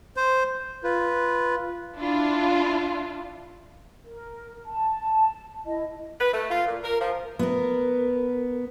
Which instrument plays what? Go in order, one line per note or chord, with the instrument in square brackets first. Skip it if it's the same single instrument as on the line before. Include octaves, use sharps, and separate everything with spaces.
[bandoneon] C5
[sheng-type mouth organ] F4 B4
[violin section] D4 E4 F4
[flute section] A#4
A5
E4 D#5
[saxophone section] B4
A3
F4
A#2
A#4
F3
[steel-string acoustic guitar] B3 A#4